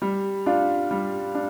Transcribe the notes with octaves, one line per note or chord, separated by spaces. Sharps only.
G3
D4 F4
G3
D4